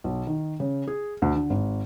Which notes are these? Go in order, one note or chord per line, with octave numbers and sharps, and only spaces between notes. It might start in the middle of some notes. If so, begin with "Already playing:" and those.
B1
D#3
C#3
G#4
D2
D3
G#1